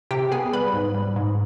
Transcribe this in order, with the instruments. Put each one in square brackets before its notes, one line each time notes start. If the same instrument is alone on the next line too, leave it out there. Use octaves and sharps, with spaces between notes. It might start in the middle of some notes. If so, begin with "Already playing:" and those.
[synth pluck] C3 G4 G5
B3 G#4 G#5
G3 B4 B5
G#2
G3
G#2